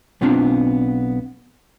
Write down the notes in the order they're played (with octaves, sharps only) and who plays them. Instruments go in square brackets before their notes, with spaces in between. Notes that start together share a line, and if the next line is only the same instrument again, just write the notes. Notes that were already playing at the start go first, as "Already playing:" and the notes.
[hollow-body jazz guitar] B1 B3 C4 D4 F4